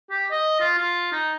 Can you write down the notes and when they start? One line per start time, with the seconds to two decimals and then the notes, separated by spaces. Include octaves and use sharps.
0.11 G4
0.32 D#5
0.61 F4
0.78 F4
1.12 D#4